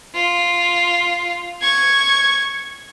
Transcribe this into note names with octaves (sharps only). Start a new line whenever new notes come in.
F4
C#6 G#6